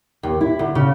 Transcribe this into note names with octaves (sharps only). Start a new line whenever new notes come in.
D#2
E4
D2
C#3